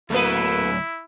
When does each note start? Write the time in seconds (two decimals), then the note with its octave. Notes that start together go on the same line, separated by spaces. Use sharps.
0.10 D2 F#3 A3 A#3 E4 B4